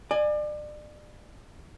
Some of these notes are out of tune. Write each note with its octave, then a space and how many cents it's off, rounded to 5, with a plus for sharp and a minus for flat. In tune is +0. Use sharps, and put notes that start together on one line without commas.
D5 +35 G#5 +0